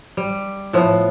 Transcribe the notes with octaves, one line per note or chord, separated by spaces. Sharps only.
G3
A2 F3 B3